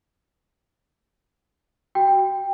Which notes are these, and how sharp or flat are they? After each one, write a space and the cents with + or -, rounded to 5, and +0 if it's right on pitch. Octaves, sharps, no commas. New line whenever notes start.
F#4 +25 G5 +10